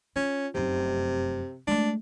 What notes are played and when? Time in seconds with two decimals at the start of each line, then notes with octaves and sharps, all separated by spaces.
0.16 C#4 F4
0.55 F1 F#2 C3
1.67 G#3 A3 D4